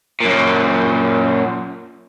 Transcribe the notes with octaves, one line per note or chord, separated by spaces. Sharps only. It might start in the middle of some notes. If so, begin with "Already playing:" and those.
F#2 A#2